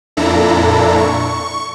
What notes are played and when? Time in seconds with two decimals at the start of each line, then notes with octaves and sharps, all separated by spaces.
0.17 F2 A#2 D4 E4 A4 A#5
0.98 C#6